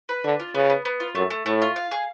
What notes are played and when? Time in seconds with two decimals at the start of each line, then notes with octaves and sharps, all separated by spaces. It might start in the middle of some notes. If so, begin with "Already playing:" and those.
0.09 B4
0.24 D3 D4
0.40 F4
0.54 C#3 B3
0.70 B3
0.85 B3
1.00 F4
1.15 F#2 A3
1.30 A3
1.46 A2 A3
1.62 F4
1.76 F5
1.91 G#4